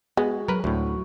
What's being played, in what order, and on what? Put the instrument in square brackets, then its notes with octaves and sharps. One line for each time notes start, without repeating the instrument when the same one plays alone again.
[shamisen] G#3 [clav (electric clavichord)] B3 [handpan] F#4
[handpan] F#3 [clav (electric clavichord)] A#4 B4
[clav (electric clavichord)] D2 A2 [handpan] F#4